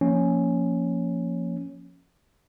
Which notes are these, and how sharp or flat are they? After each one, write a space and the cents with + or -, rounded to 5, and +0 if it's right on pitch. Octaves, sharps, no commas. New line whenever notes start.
F3 +0 A#3 +0 C#4 +0